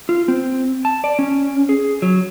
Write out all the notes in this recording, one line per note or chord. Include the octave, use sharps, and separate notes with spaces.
F4
C4
A5
D5
C#4
G#4
F#3